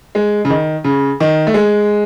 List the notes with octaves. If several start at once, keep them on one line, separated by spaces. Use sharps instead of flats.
G#3
C#3
D#3
C#3
D#3
A3
G#3